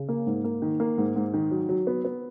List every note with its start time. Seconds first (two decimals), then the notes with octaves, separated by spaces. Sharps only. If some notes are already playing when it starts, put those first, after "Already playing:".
Already playing: C#3
0.09 A#3
0.27 G#2
0.44 A#3
0.62 D#3
0.80 A#3
0.98 G#2
1.16 G#2
1.34 D#3
1.51 F#3
1.69 F#3
1.87 B3
2.05 B3